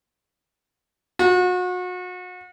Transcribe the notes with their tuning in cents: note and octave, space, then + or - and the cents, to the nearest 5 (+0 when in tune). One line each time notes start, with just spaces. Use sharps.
F#4 -35